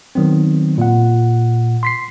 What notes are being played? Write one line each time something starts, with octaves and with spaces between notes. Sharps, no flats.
D#3 F#3 B3 C4
A#2 F#5
C6 B6 C7